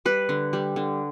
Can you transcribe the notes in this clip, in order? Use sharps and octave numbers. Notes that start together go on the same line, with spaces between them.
G3 B4
D3
G3
D3